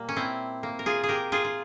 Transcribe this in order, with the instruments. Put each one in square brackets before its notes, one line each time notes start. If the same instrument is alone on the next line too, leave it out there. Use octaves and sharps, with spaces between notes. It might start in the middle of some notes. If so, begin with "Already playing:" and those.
Already playing: [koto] A#2 G3 A#3
C#4
C4 E4
A#3
A#4
F4 G#4
G#4
G4 A#4
F4 G#4
F4